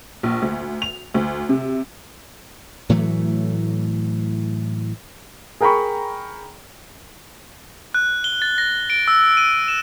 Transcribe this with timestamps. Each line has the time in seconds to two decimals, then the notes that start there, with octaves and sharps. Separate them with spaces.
0.23 A#1
0.42 D2
0.82 F7
1.14 D2
1.49 C3
2.89 A2 E3 F#3 A3
5.61 G#4 A#4 G5 A#5 B5 C#6
7.94 F#6
8.24 G7
8.42 A6
8.58 A#6
8.90 D7
9.08 E6
9.37 D#7
9.68 E7